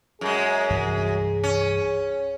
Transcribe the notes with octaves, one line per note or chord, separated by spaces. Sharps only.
F#2 G#3 G#4
C2 G2 E3
C#4